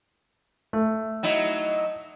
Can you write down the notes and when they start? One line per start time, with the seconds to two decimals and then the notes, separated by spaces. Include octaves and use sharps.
0.73 A3
1.23 F#3 D#4 E4